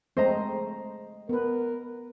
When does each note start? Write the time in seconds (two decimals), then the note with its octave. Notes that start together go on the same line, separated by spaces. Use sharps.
0.17 G#3 A3 C4 C5 D#5 A#5
1.29 B3 A#4 B4